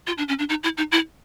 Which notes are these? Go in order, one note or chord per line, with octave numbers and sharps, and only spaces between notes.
F4
D4
C#4
D4
D#4
E4
D#4
E4